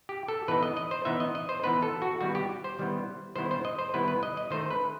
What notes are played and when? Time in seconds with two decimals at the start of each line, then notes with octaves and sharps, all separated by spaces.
0.09 G4
0.28 A4
0.48 E3 B3 D#4 B4
0.63 D#5
0.77 D#5
0.91 C5
1.05 E3 B3 D#4 E5
1.20 D#5
1.35 D#5
1.49 C5
1.63 E3 B3 D#4 B4
1.82 A4
2.02 F#4
2.21 D#3 G3 B3 E4 F#4
2.35 G4
2.64 C5
2.79 D#3 G3 B3 E4
3.36 D#3 G3 B3 E4 C5
3.51 C5
3.65 D#5
3.79 C5
3.94 D#3 G3 B3 E4 B4
4.08 B4
4.23 D#5
4.37 D#5
4.51 D#3 A3 D#4 C5
4.70 B4